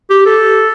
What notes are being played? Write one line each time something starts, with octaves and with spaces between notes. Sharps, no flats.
G4
A4